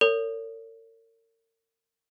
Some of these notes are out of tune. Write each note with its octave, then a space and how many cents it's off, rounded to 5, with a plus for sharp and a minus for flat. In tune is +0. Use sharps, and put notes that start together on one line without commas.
A#4 -40 C#5 +30